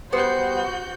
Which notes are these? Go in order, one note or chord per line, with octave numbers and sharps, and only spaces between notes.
G3 B3 F#4 C5 G6